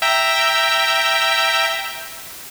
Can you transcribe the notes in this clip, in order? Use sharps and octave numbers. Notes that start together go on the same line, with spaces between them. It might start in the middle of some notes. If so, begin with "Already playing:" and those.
E5 G5 A#5